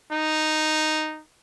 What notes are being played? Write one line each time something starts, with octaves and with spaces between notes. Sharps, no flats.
D#4